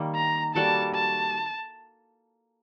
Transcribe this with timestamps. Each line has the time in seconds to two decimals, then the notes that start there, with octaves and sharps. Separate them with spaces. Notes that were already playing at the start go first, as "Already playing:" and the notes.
Already playing: D#3 G3 A#3
0.15 A#5
0.55 G3 A#3 F#4 A4 A5
0.95 A5